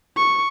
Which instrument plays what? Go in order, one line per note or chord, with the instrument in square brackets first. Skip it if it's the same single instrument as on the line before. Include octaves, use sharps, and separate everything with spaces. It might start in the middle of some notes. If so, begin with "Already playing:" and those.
[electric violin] C#6